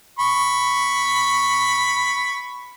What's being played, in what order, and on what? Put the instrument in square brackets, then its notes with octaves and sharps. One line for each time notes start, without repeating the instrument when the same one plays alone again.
[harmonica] B5 C#6